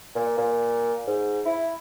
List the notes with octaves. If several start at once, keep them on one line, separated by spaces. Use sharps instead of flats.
A#2
A#2
G#2
E4